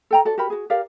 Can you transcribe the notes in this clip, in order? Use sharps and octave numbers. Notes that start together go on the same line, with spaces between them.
A4 G5 A#5
F#4 A4 D5
F#4 G4 A#4 B5
F#4 G#4
G4 A#4 D5 F5